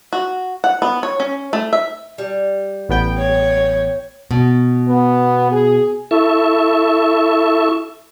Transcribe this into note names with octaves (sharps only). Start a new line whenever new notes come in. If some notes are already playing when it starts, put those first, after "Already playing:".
F#4
F#5
B3
C#5
C#4
A3
E5
G3
A1 B3 G5
C#5
B2
B3
G#4
E4 A4 E5 C#6